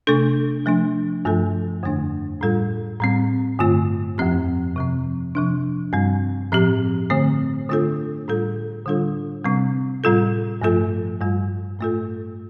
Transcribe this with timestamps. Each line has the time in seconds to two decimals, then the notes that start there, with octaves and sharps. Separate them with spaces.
0.07 C3 A3 D4 A4
0.66 F3 A3 D4
1.25 G2 F3 A3 F4 A4
1.83 F2 D3 A3 D4
2.41 A2 G3 F4 A4
3.00 A2 G3 C4
3.59 G2 D3 A3 F4
4.18 F2 F3 C4 G4
4.76 C3 F3 C4
5.35 C3 F3 D4
5.93 G2 G3 C4
6.52 A2 F3 C4 G4
7.10 D3 A3 C4
7.69 D3 A3 D4 F4 A4
8.28 A2 G3 F4 A4
8.86 D3 G3 D4 F4 A4
9.45 C3 G3 C4
10.04 A2 G3 F4 A4
10.62 G2 F3 A3 F4 A4
11.21 G2 G3 F4
11.79 A2 A3 F4 A4